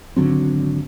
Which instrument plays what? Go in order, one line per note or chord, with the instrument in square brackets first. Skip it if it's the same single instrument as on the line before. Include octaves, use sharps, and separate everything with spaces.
[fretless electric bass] G#1 D3 F#3 C4